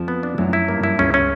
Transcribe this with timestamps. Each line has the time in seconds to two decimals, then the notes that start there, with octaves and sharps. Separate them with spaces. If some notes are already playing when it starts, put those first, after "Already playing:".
Already playing: F2 F3
0.08 B3
0.23 D4
0.38 F#2 F#3 E4
0.53 E4
0.68 G2 G3 A#3
0.84 E4
0.99 C#2 C#3 C#4
1.14 C#4